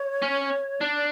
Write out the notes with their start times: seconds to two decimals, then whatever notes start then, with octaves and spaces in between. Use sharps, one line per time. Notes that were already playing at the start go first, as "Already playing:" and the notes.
Already playing: C#5
0.22 C#4
0.80 D4 D5